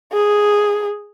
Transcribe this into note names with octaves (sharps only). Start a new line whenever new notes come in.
G#4